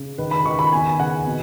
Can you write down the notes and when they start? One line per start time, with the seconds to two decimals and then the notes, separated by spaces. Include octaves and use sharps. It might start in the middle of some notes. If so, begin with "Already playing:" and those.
Already playing: C#3
0.18 D#3 B4
0.31 B5
0.46 D#3 C#6
0.59 B5
0.72 B3 G#5
0.99 C#3 F#5
1.26 B2